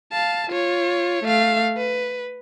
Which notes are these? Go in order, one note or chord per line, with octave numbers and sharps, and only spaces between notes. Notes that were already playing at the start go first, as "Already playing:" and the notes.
F5 A5
F4 C#5
A3 F5
B4